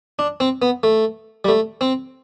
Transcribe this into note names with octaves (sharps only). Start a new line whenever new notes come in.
D4
C4
B3
A3
G3
A3
C4